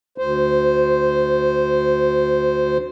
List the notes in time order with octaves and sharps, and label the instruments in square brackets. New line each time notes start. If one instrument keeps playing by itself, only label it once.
[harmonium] D2 C5